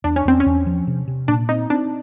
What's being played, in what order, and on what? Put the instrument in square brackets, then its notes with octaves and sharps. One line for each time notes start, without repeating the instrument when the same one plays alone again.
[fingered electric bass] E2 [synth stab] D4
[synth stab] C#4
[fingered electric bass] E2 [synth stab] C4
[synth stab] C#4
[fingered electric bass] E2
F3
C3
C3
[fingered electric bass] A#2 [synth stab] D4
[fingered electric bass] C4 [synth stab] D#4
[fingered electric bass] C4 [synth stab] D4